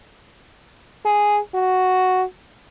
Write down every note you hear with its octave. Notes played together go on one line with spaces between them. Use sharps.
G#4
F#4